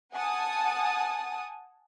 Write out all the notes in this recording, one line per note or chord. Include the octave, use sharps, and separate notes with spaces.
F#5 G#5 A5 D#6